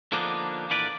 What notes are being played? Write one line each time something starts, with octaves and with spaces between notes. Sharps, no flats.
D3 F3 A#3 B3 D4 D#4
A#2 D3 E3 A#4 B4 D5